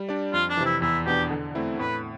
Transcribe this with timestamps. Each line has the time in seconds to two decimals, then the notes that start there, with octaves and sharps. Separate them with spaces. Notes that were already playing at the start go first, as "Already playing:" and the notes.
Already playing: G3
0.09 D4 G4 D5
0.33 F2 F4
0.49 D4
0.57 C3 E3
0.65 E4
0.82 E2 E4
1.06 B2 B3 D4 G4
1.30 D3
1.55 A3 C4 E4
1.79 A2 B4